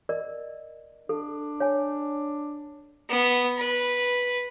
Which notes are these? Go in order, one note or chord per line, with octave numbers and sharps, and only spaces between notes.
A#4 D5 D#5
D4 A4
C#5 G#5
B3
B4